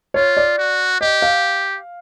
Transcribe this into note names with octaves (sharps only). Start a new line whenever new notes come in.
F4 C#5
D5
F#4
G4 D#5
F5